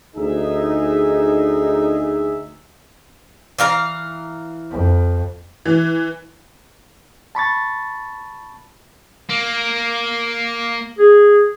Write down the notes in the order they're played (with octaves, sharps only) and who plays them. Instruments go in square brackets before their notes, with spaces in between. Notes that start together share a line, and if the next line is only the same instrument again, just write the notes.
[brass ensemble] D2 D#4 G#4 E5
[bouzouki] E3 F5 A#5
[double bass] F2
[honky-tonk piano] E3
[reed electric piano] A5 B5 C#6 A6
[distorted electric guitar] A#3
[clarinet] G#4